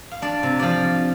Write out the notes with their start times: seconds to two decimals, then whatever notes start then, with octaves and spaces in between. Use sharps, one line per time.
0.11 F5
0.22 D4 D5
0.43 C3
0.60 F3 D5 F5